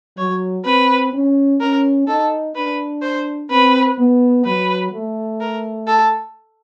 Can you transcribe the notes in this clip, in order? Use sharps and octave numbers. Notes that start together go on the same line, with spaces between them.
F#3 C#5
C4 B4
C#4
C#4 A#4
D#4 A4
D4 B4
C5
C4 B4
B3
F#3 B4
A3
A#4
A4